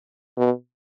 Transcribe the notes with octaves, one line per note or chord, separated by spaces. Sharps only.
B2